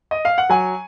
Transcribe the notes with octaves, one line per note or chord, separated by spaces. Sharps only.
D#5
F5
F#5
F#3 G#5